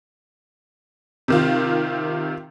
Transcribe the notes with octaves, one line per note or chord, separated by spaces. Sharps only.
C3 D#3 F4